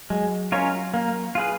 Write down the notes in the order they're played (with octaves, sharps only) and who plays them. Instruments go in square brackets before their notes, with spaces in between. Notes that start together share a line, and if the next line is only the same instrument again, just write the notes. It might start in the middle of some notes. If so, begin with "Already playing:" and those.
[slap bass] F#3 [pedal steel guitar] G#3
[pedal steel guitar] C#4 F4 A#4 C#5
A#3
F4 G#4 B4